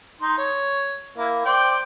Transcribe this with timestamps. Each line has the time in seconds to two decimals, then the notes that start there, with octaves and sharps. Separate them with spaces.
0.22 D#4 C6
0.38 C#5
1.18 A#3 E4
1.45 C5 D5 G5